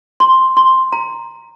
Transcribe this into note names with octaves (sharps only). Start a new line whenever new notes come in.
C6
C6
A#5